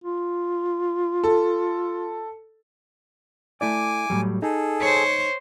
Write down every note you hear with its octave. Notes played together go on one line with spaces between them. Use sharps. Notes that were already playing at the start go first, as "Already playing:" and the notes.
F4
A4
A3 E4 D5 G#5 D6
A2 F#3 G3
D#4 G#4 A4
C5 C#5